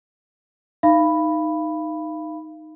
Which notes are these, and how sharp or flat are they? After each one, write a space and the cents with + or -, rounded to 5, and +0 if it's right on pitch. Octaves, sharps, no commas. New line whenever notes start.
D#4 +0 F5 -30 B5 +0